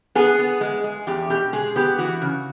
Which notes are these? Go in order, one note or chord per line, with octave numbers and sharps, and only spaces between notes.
B3 G#4
B3
G#3
G#3
E2 G4
B2 G4
G#3 G#4
B3 G4
E3 F#4
C#3